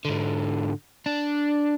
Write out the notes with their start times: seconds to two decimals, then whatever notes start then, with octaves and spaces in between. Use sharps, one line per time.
0.05 G#2 D3
1.06 D4